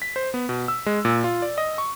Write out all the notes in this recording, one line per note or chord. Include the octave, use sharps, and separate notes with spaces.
B6
C5
B3
B2
E6
G#3
A#2
F4
D5
D#5
C#6